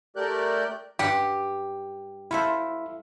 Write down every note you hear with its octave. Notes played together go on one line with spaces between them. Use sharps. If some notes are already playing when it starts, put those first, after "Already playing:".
A3 G4 A#4 D5 F#6 G6
G2 G4 F#5
E4 F4 A4 C5 E5